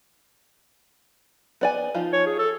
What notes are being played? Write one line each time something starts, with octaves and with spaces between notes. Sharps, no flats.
B3 D5 G#5
F3 D#4 F4
C#5
G#4
A4